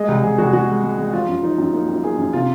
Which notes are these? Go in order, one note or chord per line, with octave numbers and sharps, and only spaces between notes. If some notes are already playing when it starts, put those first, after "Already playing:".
Already playing: G#3 D#5
C2
C2 G#4
C2 F#4
G#3 F#4
G#3
G#3
G#3
F3 F4
F#2
F3 D#4
F#2
A#3 D#4
F#2
A#3 G#4
F#2
C3 F4